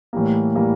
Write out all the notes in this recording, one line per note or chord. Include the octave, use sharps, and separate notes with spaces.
A2 E3 G3 A#3
A2 E3 G3 A#3